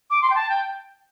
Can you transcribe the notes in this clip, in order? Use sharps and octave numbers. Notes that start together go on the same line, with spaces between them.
D6
C6
G5
A5
G5